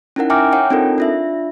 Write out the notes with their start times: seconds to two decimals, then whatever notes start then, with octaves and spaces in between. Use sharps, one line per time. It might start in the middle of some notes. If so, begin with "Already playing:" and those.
0.16 C#4 D#4 E4 A#4 F#5
0.30 E5 G5 G#5 A#5 D6 F6
0.52 C#5 F#5 G5
0.70 C4 D4 D#4 F4 A4 A#4
0.98 D4 F4 E5